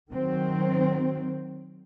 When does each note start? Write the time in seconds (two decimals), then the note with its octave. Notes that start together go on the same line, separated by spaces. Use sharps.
0.11 D#3 F#3 C4